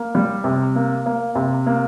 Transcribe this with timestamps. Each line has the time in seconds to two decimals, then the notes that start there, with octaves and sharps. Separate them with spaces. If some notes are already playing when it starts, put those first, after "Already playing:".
Already playing: A#3
0.15 G3
0.44 C3
0.76 A#3
1.06 A#3
1.35 C3
1.67 A#3